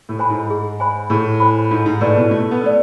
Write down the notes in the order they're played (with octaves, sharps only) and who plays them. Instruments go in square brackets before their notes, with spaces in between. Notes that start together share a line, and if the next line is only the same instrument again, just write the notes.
[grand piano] A2
[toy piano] C5 G#5 B5
[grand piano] G#2
[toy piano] G#4
C5 G#5 B5
[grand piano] A2 [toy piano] G#4
[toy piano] C5 G#5 B5
[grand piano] G#2 [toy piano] F4
[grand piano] G#2
[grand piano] A2 [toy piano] B4 D5
[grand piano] B2
[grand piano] A3 [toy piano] F4
[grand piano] B3
[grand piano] A3 [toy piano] B4 D5